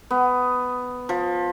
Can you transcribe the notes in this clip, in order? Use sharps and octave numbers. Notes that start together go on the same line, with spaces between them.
B3
F3